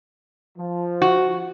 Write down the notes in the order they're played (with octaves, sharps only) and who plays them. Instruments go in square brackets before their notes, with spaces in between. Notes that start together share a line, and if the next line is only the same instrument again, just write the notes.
[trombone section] F3
[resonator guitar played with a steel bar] F#4